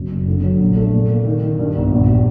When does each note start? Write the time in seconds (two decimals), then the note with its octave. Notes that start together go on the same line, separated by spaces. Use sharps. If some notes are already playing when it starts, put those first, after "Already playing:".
Already playing: F#1 F#2
0.11 F#1
0.28 D3
0.43 F#3
0.60 A#1
0.76 A3
0.93 A#2
1.09 A#3
1.25 D#3
1.42 D#3
1.59 G2
1.76 G1
1.92 A#1
2.08 G3